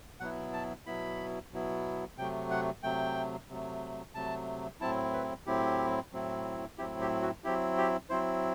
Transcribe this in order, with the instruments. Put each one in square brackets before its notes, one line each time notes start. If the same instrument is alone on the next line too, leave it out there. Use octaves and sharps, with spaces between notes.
[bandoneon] B2 F#3 B3 E4 F#5
A5
B2 F#3 B3 E4 B5
B2 F#3 B3 E4
C3 F#3 A3 G5
F#5
C3 F#3 A3 G5
C3 F#3 A3
C3 F#3 A3 A5
A2 F#3 C4 E4 A5
B4
A2 F#3 C4 E4 G4
A2 F#3 C4 E4
A2 F#3 C4 E4 G4
G4
F#4
F#3 C4 E4 G4
G4
F#3 C4 E4 C5